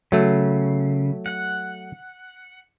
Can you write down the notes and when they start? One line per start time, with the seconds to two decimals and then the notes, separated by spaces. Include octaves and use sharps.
0.12 C#3 F#3 A3
1.26 F#5